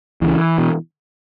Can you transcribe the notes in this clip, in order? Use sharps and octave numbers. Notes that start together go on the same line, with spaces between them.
C#2 C#3 E3
B2